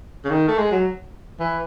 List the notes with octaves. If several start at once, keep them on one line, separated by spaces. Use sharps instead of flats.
C#3
D#3
A3
G#3
F#3
E3